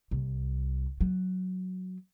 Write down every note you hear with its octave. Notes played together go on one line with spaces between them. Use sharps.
C2
F#3